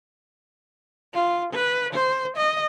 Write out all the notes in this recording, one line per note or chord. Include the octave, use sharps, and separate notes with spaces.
F4
B4
C5
D#5